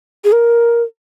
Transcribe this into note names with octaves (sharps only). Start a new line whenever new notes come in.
G#4
A#4